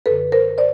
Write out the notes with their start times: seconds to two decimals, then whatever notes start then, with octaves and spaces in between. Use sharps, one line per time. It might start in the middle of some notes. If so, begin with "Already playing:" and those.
0.06 F#2 D3 A4 B4
0.32 A#4 C5
0.58 C5 D5